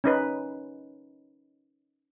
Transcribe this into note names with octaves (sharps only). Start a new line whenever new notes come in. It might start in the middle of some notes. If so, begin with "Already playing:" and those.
C#4 D#4 B4